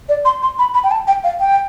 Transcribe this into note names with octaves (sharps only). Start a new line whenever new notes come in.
D5
C6
C6
B5
B5
G5
A5
G5
F5
G5